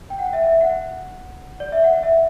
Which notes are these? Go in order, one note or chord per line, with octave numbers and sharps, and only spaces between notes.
G5
F#5
E5
E5
F#5
D5
E5
F#5
E5